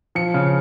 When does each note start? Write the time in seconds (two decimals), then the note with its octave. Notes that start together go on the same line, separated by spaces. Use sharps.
0.15 F3 C#7
0.34 C#3